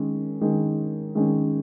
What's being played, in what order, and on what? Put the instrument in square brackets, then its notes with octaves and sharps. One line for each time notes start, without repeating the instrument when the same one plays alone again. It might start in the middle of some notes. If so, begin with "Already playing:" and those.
Already playing: [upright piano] D#3 G#3 C#4
D#3 G#3 C#4
D#3 G#3 C#4